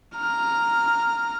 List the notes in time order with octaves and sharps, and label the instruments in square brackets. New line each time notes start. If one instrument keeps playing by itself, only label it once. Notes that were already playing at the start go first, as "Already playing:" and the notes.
[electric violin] A#5 F6